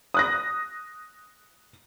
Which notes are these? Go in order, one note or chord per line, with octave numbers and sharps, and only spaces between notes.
D#6 F#6 A#6